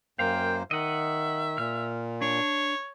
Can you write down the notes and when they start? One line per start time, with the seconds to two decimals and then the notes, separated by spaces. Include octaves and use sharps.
0.19 F#2 A#3 C5 F5 G5
0.71 D#3 D#5 E5 F#5
1.58 A#2 F6
2.22 D4 C#5